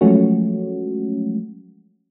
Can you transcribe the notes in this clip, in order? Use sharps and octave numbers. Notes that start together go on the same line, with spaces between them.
F3 F#3 G#3 A3 C#4 F#4